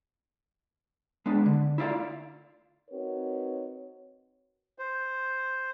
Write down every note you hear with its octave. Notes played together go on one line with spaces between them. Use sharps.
G#3 B3 D4
D3
E4 F4 D5 E5 F5
C4 D#4 F#4 A#4 B4 C#5
C5